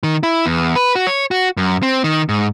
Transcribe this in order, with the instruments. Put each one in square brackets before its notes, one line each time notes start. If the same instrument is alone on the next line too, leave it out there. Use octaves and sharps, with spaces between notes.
[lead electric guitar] D#3
E4
E2
B4
F#4
C#5
F#4
F#2
C4
D#3
G#2